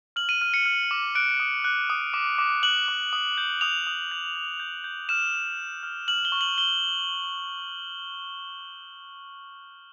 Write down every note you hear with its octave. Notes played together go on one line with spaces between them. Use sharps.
F6 F#7
D#7
F6 D#7
C#7
F6
D6
F#6 D7
D#6
F#6
D#6
D6
D6
F#6 F#7
D6
D#6
G6
D#6 F7
D#6
G6
G6
G6
G6
F6 E7
F6
F6
F6
F6 F#7
G7
C#6
F#7
F6 G7